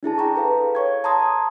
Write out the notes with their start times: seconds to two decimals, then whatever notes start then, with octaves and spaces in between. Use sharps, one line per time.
0.03 D4 E4 G#4 A5
0.18 G5 A#5 C#6
0.35 A4 B4 F5
0.75 C#5 C#6 G#6
1.04 A5 A#5 C6 D#6 G#6